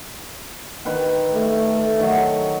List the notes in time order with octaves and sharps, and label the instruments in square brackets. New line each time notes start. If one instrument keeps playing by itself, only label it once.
[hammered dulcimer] D#3 B4 G5
[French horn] A3
[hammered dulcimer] D#3 F#3